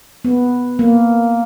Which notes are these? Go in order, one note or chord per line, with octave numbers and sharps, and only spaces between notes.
B3
A#3